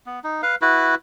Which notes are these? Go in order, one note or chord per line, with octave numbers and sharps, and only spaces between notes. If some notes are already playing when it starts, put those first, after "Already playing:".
B3
D#4
B4 F5
E4 F#4 B4